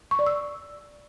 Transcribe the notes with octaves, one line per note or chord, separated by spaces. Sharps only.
C#6
D5
E6